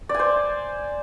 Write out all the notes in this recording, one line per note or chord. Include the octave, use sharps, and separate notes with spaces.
D5
G#5
C5